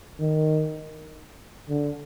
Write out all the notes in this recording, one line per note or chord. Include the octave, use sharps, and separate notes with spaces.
D#3
D3